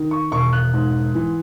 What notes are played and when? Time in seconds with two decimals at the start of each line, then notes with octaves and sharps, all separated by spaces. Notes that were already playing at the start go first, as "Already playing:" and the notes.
Already playing: D#3
0.11 C#6
0.32 E1 C#6
0.53 F#6
0.73 G#2
1.15 E3